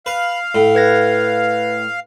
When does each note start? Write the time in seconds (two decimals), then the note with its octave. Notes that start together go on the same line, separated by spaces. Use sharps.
0.06 B4 F5
0.55 A2
0.75 B4 G#6 A#6